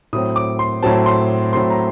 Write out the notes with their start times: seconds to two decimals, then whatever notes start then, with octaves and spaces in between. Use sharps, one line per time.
0.13 A2 F#3 C4 D#6
0.36 D6
0.59 C6
0.82 A2 F#3 C4 A5
1.06 C6
1.53 A2 F#3 C4 C6
1.70 A#5